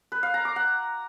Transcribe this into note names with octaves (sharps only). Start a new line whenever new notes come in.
B4
F5
A#5
D6
F#5